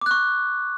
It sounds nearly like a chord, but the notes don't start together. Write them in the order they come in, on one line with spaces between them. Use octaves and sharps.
D6 F#6 C#6